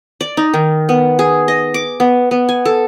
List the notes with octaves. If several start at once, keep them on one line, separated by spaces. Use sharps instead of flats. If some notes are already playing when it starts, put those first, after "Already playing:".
D5
D#4
D#3
B3
G#4
D#5
D6
B3
B3
G#5
A4